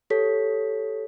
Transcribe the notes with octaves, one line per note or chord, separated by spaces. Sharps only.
G4 A4 C#5 B6